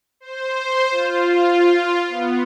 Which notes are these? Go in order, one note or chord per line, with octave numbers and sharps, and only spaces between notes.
C5
F4
B3